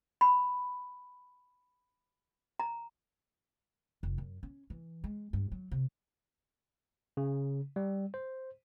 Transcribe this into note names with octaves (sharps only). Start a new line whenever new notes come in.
B5
A#5
F1
F#2
C#4
E3
G#3
G2
F#3
C3
C#3
G3
C5